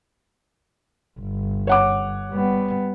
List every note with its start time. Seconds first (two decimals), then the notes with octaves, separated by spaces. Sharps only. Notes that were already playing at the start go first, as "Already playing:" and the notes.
1.19 G1
1.67 C#5 F#5 D6
2.32 G3 B3